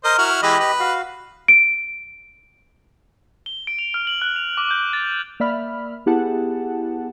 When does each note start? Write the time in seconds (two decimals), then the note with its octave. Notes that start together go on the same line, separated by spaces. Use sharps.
0.04 A#4 C5 D#5
0.18 E4 F#4 F6
0.42 E3 G#3 G4 B4 D#5
0.60 B4
0.80 F#4 F5
1.48 D7
3.46 G7
3.67 D7
3.79 F7
3.94 F6
4.07 F#7
4.22 F#6
4.36 F7
4.57 D6
4.71 G6
4.93 A6
5.40 A#3 D5 E5 B5 F6
6.06 B3 E4 G4 G#4 F#5 A5